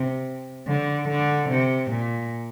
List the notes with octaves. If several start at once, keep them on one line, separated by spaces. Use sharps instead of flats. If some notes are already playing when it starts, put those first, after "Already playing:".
Already playing: C3
D3
D3
C3
A#2